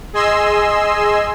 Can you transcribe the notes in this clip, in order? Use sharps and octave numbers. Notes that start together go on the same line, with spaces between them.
G#4 D#5 G#5 C6 E6